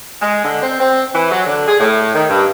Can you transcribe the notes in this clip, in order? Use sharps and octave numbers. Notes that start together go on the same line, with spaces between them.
G#3
D3
C4
C4
E3
F#3
D3
G#4
A2
D#3
G2